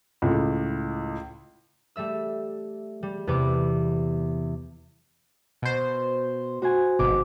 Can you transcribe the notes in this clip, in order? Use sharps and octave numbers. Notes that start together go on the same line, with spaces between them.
C#2 A2
G3 A3 E5 E6
G3
E2 C3 B3 B4 D6
B2 C5
F#4 C5 G#5
G#1 B2 D6